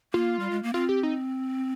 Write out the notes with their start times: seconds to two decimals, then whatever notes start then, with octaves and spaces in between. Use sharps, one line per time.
0.13 A#3 F4
0.39 G3
0.50 G#3
0.63 A#3
0.74 C4 F4
0.89 G4
1.03 D#4